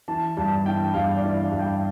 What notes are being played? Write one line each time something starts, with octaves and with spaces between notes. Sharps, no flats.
E3 A5
G2 A5
E3 G5
G2 F5
D5
E3
G2
G5